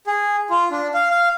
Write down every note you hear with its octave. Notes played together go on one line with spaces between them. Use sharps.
G#4
F4
D4
F5
F5